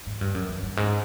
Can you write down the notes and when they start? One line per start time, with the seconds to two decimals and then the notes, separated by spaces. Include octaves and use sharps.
0.06 G#2
0.21 G2
0.35 F#2
0.49 G2
0.62 G2
0.77 G#2